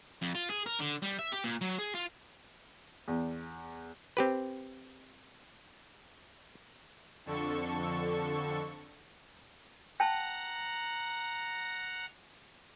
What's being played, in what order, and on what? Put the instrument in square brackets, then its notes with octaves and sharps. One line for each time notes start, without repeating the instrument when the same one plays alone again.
[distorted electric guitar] F2
F4
G#4
A#4
D3
G3
E5
G4
A#2
F#3
G#4
F4
[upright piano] E2
[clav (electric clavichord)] C4 G4 B4
[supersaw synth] F2 D3 A4 C#6
[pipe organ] F#5 A#5 [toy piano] G5 A5